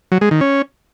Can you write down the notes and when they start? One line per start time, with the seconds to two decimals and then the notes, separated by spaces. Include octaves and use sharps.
0.12 F#3
0.21 G#3
0.31 D#3
0.41 C#4